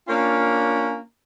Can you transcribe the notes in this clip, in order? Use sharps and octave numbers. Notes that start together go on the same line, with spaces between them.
A#3 C#4 D4 F4